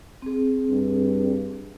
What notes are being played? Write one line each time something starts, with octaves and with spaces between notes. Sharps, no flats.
C4 G#4
G2